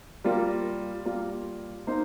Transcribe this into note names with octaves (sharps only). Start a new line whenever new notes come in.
G3 A#3 F4 A#4
G3 A#3 F4 A#4
A#3 D#4 C5